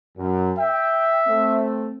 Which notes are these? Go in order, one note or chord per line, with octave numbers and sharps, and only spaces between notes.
F#2
E5 G5
A3 C4